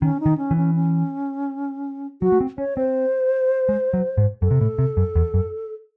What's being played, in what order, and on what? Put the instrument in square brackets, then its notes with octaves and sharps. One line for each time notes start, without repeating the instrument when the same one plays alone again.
[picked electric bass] D#3 [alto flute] C#4
[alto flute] D#4
[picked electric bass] D#3
[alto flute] C#4
[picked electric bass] E3
[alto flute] C#4
C#4
[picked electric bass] F#3 [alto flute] F#4
[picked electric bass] A3
C4
[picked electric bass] C#4 [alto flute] C#5
[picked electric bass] C4 [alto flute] C5
[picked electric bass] G#3
F#3
G#2
[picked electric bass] F#2 [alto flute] A4
[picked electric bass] C3
A2
C3
F#2
E2
F#2